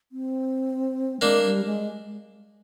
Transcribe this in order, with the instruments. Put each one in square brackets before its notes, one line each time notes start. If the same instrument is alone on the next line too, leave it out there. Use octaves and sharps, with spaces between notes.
[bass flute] C4
[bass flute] G#3 [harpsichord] A#3 D4
[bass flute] G3
G#3